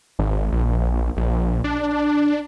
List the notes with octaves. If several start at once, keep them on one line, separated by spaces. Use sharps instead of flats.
G#1
A#1
A#1
D4